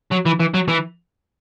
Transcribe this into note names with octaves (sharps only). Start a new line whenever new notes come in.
F#3
E3
E3
F#3
E3